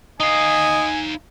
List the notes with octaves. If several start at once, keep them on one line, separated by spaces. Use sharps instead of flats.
D#4 D#5 F5 G#5